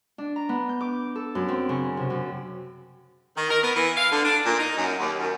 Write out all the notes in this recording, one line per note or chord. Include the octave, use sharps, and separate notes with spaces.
D4
A#5
B3
G6
D6
A4
F#2
C4
C#3
C3
F#2
D#3
A#4
B3
E3
F5
D3
D4
A#2
D#4
F#2
D#2
F#2